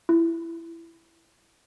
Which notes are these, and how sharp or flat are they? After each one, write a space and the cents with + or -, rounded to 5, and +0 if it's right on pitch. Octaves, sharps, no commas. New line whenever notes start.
E4 +15